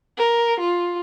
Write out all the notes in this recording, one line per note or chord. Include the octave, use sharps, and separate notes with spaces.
A#4
F4